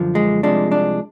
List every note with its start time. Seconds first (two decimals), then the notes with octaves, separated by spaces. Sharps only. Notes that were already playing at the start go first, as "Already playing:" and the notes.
Already playing: F#2 D3 F3
0.15 G#3
0.43 C2 C3 F3 G#3 D4
0.72 D4